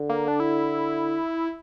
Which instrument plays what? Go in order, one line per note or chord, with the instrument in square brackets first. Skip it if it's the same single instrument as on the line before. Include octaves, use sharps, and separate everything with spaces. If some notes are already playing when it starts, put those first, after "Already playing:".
Already playing: [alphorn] D3
[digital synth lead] A#3
D4
E4